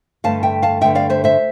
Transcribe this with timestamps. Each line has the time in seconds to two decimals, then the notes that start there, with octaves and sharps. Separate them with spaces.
0.24 G2 D3 A3 F5 A5
0.43 E5 G5
0.62 F5 A5
0.81 G2 D3 A3 E5 G5
0.95 D5 F5
1.10 C5 E5
1.24 C5 E5